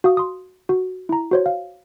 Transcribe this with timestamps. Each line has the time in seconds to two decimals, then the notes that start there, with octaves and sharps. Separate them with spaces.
0.04 F#4 F5 D#6
0.17 C6 D#6
0.69 F#4
1.09 E4 A#5
1.31 F#4 C5 C#5
1.46 F5